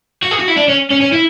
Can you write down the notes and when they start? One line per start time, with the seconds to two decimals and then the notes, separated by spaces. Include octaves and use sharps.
0.22 F#4
0.31 G#4
0.39 F#4
0.48 E4
0.56 D4
0.68 C#4
0.90 C#4
1.01 C#4
1.12 E4